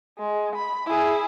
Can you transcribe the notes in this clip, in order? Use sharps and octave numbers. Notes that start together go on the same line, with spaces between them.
G#3
B5
E4 G#4